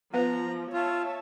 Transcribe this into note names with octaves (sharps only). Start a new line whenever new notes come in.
F3 B3 B4 A#5
F4 C#5 E5 A5